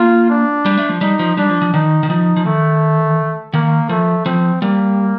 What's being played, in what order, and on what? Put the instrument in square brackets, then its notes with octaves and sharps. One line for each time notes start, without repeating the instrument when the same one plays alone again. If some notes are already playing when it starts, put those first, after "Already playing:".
Already playing: [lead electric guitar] A#3 [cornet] F4
[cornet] D4
[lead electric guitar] G3
A3
F3
[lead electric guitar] G3 [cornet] D#4
[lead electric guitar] F3
[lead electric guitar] G3 [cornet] D4
[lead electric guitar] F3
F3
[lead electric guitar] D#3 [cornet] D#4
[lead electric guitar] D#3
[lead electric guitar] F3 [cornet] D#4
[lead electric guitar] F3
[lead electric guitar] D#3 [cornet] A3
[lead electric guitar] D#3 [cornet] A#3
[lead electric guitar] F3 [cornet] A3
[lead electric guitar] F3 [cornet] C4
[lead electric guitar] G3 [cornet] A#3